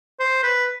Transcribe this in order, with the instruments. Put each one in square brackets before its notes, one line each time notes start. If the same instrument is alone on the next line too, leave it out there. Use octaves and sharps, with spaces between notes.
[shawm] C5
B4